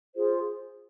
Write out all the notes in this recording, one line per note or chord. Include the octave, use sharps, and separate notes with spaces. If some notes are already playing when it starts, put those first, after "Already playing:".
F4 G#4 C5